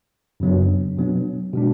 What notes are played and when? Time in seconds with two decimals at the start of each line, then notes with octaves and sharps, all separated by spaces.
0.40 F#2 C#3 F#3 B3 D4
0.97 B2 F#3 B3 D4
1.54 B2 G#3 D4